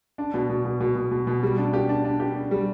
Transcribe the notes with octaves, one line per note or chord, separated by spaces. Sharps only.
D4
B2
B2
B2
B2
B2
B2
B2
G3
D4
G4
D4
D4
G4
D4
G3